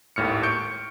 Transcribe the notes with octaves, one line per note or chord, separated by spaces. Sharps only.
G#1 D#2 A2 F6 C#7
C#6 G6 C#7 D7